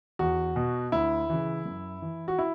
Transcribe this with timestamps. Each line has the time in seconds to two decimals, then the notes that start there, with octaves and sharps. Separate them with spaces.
0.19 E2 F#4
0.56 B2
0.92 D2 E4
1.30 C#3 E3
1.65 F#2
2.02 E3
2.28 F#4
2.39 E4